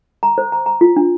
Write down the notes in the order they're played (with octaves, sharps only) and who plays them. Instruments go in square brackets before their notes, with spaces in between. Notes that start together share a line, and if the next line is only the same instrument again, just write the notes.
[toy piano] A#5
C5
A#5
A#5
F4
D4